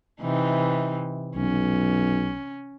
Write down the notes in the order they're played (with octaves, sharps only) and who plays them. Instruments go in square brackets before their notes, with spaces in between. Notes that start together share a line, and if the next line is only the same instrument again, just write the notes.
[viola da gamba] C3 E3 D#4
[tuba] B1 [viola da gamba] C#4